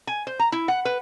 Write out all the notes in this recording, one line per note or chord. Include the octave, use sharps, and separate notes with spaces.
G#5
C5
A#5
E4
F#5
B4